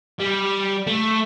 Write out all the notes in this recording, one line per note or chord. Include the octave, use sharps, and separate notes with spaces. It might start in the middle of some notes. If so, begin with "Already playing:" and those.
G3
A3